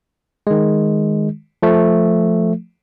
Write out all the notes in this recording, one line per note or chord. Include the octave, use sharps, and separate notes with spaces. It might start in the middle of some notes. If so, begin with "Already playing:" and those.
D#3 G#3
F3 A3